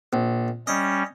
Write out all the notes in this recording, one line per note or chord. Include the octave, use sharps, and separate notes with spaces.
A#1
G3 C#4 D#5